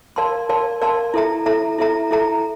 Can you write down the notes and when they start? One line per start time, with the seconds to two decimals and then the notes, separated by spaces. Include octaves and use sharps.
0.16 A#4 D5 F5 A5 C6
0.49 A#4 D5 F5 A5 C6
0.81 A#4 D5 F5 A5 C6
1.14 E4 A4 E5 A#5
1.46 E4 A4 E5 A#5
1.78 E4 A4 E5 A#5
2.11 E4 A4 E5 A#5